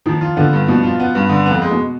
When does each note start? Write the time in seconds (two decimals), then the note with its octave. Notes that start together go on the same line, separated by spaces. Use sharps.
0.06 D#3 F3
0.21 F4
0.37 D3 B3
0.53 G2
0.68 B2 F3
0.83 F4
0.99 B3
1.15 G2
1.29 D3
1.46 F2 B3
1.62 G#3
1.71 B2